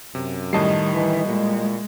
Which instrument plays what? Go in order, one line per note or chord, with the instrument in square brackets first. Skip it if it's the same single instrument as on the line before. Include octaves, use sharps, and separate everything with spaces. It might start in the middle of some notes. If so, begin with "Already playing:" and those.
[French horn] F#2 [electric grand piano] C3
[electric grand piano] A2 A5 C7 [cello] D#3 [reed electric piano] G3 D#5
[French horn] E3
[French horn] A#2 [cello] G#3